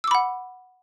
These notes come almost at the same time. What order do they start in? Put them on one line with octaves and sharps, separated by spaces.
E6 D6 B5 F#5